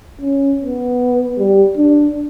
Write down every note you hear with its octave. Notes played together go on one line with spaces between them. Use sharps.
C#4
B3
G3
D4